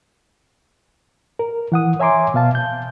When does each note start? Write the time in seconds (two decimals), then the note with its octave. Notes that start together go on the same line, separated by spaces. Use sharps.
1.39 A#4
1.72 E3 F#5 D#6
2.00 C#5 E5 G#5 A#5 C6 D6
2.34 B2 B3 F5 A5
2.55 G6